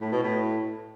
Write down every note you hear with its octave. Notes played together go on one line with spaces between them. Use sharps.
A2
B2
A2